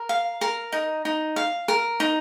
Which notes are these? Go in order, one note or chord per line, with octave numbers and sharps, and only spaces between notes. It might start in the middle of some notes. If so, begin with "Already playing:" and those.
Already playing: A#4
F5
A#4
D#4
D#4
F5
A#4
D#4